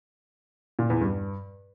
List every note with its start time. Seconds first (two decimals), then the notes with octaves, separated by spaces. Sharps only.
0.79 A#2
0.90 E2
1.01 G2